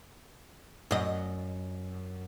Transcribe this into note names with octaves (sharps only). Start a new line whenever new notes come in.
F#2 D#5